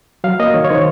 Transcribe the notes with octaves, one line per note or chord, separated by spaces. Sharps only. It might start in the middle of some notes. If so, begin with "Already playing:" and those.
F#3 F5
A#3 D#5
D#3 C#5
C#5
D#3 C5